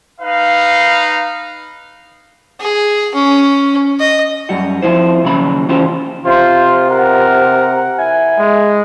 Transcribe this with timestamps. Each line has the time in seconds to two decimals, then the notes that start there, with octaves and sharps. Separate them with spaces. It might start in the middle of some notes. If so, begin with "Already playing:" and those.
0.19 D#4 B4 F5
2.60 G#4
3.14 C#4
4.00 D#5
4.49 F#2 G3 F#4
4.82 F2 E3 F3 E4 C5
5.24 D#2 C#3 F#3 B5
5.69 C#3 E3 C#4 F4 G4 C5
6.26 C3 F4 C5
6.90 A#4 F#5
7.98 E4 G#5
8.39 G#3